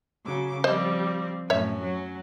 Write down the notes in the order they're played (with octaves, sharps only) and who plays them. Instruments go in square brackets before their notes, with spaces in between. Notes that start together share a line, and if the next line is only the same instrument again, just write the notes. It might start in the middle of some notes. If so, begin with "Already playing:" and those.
[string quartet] C#3 F#3 D6
[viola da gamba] F3 C4 [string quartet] G3 [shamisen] C5 D#5
[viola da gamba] F#2 A2 [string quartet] C#4 [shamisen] C#5 E5
[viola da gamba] F#3